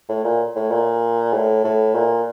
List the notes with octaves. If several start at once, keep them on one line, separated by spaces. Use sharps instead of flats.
A2
A#2
A2
A#2
A2
A2
A#2